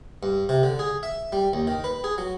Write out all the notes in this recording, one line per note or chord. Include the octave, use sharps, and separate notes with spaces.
G2
C3
D3
G#4
E5
G3
D#2
D#3
B4
G#4
F#3